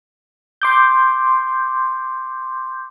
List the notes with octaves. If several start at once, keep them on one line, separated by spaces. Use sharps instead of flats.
C6 D6 G6